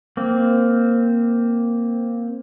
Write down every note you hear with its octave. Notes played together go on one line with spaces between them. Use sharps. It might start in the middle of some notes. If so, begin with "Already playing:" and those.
A#3 C4